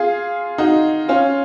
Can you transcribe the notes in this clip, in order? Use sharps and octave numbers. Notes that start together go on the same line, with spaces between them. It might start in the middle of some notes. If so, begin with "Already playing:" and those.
Already playing: F4 G#4
D#4 F#4
C#4 F4